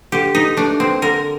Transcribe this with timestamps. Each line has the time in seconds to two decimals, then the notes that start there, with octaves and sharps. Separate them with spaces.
0.12 D3 G4
0.35 D#4
0.57 A3 D4
0.80 C4
1.02 D3 A#4